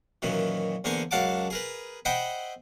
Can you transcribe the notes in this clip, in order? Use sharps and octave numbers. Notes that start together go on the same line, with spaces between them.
F#2 A#2 D#3 E3
E2 D3 A#3 C5 G#5 C#6
C#2 F#2 F5 F#5 A5 D6
G#4 A#4 B4
C5 D#5 E5 F#5 G5 B5